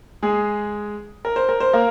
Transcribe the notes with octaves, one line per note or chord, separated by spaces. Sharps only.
G#3 G#4
A#4
C5
A#4
C5
A#3 A#4